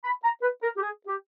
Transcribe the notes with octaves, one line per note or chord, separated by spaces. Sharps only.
B5
A#5
B4
A#4
G4
G#4
G4